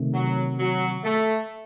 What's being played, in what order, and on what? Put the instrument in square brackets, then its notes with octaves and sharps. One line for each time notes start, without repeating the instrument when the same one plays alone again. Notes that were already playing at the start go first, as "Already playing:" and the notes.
Already playing: [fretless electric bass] C3 D#3 A3
[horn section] F#3
F#3
A3